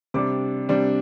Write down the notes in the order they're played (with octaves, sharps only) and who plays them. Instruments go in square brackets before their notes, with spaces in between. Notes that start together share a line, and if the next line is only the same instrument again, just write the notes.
[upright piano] C3 G3 D4 D6
C3 G3 D4